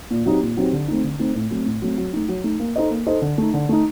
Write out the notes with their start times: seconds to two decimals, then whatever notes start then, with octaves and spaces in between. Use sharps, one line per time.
0.11 A#2
0.26 F#3 C4 D#4 G4
0.42 A#2
0.57 F#3 C4 D#4 G4
0.73 D3
0.88 A3 C4 D#4
1.04 D3
1.19 A3 C4 D#4
1.35 A2
1.51 F#3 A3 C4
1.66 A2
1.82 F#3 A3 C4
1.98 F#3
2.13 A3 D#4
2.29 F#3
2.44 A3 D#4
2.60 A#3
2.76 D#4 A4 C5 D#5
2.91 A#3
3.06 D#4 A4 C5 D#5
3.22 D3
3.38 A3 D#4
3.54 D3
3.69 A3 D#4